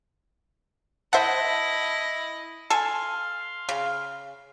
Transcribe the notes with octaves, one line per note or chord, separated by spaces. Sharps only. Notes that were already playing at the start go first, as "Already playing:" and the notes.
E4 C5 D#5 E5 F#5 A5
A4 F5 G#5 C6
C#3